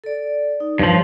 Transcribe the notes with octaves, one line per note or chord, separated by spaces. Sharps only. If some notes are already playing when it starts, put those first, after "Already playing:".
A4 D5
D#4
G2 F3 C#5